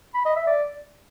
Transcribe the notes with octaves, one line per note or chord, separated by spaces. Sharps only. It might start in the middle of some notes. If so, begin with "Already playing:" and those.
B5
D#5
E5
D5